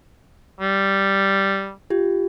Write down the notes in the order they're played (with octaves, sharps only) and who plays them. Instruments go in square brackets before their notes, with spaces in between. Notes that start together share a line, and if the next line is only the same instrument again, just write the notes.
[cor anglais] G3
[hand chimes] F4 G4